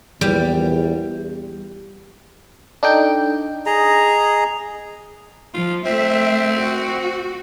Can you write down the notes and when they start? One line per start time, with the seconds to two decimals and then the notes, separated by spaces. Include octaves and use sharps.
0.21 A#1 E2 G3
2.83 D4 D#4 A4 G5
3.66 G#4 D#5 A#5
5.54 F3 F4
5.86 A3 C4 E5
6.60 F#4